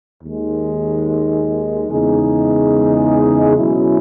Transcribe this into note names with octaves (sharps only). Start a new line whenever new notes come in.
D#2 D#3 G#3
E2 C#3 G#3 D#4 G#4
B2 F#3 C#4 E4